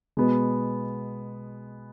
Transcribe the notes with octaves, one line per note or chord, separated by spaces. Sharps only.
B2 G#3 B3